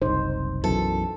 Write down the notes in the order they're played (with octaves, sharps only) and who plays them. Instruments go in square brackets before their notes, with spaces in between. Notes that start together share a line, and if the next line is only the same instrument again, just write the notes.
[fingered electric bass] F#1 C2 [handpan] D#4 C5
[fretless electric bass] B1 F#2 E3 [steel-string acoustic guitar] A4